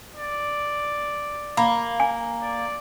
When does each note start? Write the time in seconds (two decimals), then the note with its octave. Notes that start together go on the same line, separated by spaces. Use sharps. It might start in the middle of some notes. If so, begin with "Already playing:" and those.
0.16 D5
1.57 A#3 B5
2.00 G#5
2.42 D5